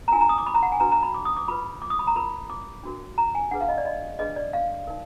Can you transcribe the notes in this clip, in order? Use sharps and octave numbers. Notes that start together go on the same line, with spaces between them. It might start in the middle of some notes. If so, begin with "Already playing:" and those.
A#5
D4 F4 A#4 G#5
A#5
D#6
D6
B5
A#5
F#5
G#5
D4 F#4 B4 A#5
A#5
B5
D6
D#6
D6
F4 B4 B5
D6
D#6
B5
A#5
F4 A#4 B5
D6
D4 F#4 A#4
A#5
G#5
D4 G#4 B4 F#5
F5
D#5
D5
D#5
D4 G#4 B4 D#5
D5
F5
D#4 A#4